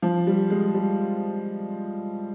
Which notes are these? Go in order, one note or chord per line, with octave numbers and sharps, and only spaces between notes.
F3
G3
G#3
G3